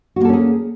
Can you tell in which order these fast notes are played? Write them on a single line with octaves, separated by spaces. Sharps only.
F#4 A#3 A4 C#4 G#4